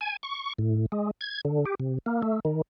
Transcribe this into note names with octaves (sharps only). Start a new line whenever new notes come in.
G#5
C#6
A2
G#3
G#6
D3
G4
C3
A#3
A3
D#3